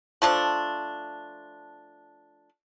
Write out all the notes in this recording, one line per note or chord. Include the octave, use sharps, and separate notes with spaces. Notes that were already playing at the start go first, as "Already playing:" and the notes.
F3 A3 D4